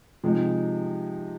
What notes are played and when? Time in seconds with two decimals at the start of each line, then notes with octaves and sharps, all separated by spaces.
0.24 C3 F3 G#3 D#4